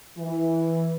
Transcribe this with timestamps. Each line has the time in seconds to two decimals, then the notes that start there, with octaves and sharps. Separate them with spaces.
0.17 E3